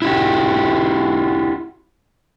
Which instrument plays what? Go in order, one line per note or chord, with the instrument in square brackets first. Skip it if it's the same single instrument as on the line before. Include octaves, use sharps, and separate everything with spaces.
[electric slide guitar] E4 F#4 G4